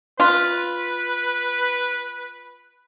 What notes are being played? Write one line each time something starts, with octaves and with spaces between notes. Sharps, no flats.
F4 B4